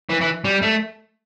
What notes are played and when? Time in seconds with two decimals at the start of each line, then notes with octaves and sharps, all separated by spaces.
0.09 E3
0.21 E3
0.45 G3
0.62 A3